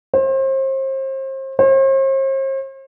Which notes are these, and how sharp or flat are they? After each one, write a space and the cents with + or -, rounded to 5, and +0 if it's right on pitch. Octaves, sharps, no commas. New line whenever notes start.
C5 +35
C5 +45